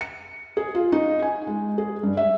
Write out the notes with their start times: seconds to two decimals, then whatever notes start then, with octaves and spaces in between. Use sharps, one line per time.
0.01 C#7
0.57 G#4
0.75 F4
0.92 D#4
1.22 G#5
1.47 G#3
1.78 G#4
2.03 G2
2.17 E5